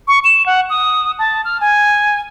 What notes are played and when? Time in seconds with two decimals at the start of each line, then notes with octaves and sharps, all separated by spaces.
0.08 C#6
0.24 E7
0.46 F#5
0.70 D#6
1.19 A5
1.45 F6
1.61 G#5